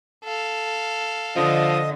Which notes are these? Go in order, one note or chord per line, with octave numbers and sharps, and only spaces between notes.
A4 F5
D3 F3 D#5 D#6